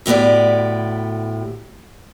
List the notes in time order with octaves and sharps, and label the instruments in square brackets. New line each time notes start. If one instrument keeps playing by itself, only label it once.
[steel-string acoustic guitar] D2 A2 B3 G4 D5